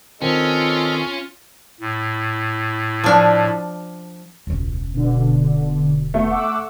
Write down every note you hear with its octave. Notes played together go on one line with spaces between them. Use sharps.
D#3 C4 C#4 F4 A4 D#5
A2
F3 D4
E1 C#2 C#4
B2 D3
A3 B3
F#5 D6 E6